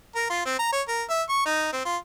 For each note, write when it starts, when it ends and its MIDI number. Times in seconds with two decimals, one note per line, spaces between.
0.15 0.26 70
0.30 0.42 65
0.45 0.56 60
0.59 0.71 82
0.72 0.82 73
0.88 1.04 70
1.10 1.22 76
1.29 1.41 85
1.45 1.71 63
1.72 1.83 60
1.85 1.97 65